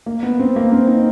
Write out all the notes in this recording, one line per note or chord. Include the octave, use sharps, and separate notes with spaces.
A#3
B3
C4
A#3
C4
D#4